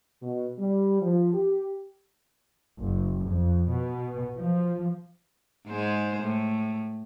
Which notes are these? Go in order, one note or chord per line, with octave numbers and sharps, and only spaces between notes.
B2
G3
F3
G4
F#1
F2
B2
F3
G#2 G#3 C5
A2